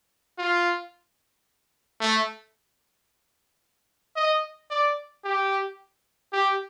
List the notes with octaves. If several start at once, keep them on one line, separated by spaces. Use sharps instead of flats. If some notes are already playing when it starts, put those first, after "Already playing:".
F4
A3
D#5
D5
G4
G4